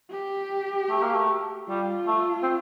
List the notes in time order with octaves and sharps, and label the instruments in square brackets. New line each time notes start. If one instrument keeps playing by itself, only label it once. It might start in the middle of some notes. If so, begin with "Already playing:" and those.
[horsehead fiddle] G4
[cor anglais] A3
A#3
A3
[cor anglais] G3 [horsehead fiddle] F4
[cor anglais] A3
C4